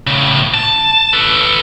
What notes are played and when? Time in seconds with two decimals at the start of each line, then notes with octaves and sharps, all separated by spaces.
0.07 A2 C#3
0.54 A5
1.13 A4 B4